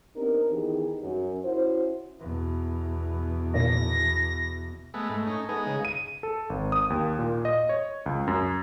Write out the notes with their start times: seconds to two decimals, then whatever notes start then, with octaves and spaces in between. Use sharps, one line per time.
0.16 B3 C4 D4 D#4 G4 A#4
0.52 D#3 E3 B3 D#4 G4 G#4
1.03 F#2
1.44 C#4 E4 F#4 C5
2.20 E2 B2
3.54 A#2 D#3 A#6
4.94 G#3 A3 B3
5.09 G#2 A3
5.27 C#4 D#4 A#5
5.49 G#3 B3 D#4 G#4
5.67 C#3
5.85 D#7
6.23 A4
6.50 G#1
6.72 D#6
6.90 D#2
7.19 A#2
7.45 D#5
7.69 C#5
8.06 C#2
8.27 F#2